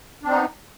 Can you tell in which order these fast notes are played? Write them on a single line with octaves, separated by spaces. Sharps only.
D4 C4 D#4 B3